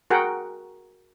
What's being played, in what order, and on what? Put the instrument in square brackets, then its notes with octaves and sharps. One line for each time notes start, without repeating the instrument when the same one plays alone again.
[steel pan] F#4 G#4 A#4 F#5 G5